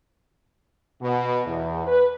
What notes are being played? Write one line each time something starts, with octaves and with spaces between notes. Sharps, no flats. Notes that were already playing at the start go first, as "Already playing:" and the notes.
B2
E2
B4